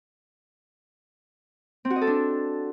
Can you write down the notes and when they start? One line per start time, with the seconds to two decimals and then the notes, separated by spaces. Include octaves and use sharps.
1.85 C4
1.90 F#4
1.96 D#5
2.01 A4
2.07 D4